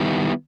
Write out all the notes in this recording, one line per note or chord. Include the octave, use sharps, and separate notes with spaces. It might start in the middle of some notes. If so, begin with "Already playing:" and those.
Already playing: D#3 G3 B3 E4